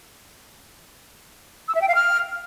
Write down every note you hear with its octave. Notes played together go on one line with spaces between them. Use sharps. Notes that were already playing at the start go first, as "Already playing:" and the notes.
E6
E5
G5
F5
F6